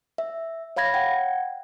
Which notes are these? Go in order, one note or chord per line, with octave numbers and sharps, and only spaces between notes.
E5
C#5 F5 B5 G#6 A#6
F#5 G5